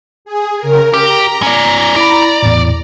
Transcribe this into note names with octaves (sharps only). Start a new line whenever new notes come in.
G#4
C#3 A#4
G4 A#5
C#4 D5
E4 D5 B5
E2 A2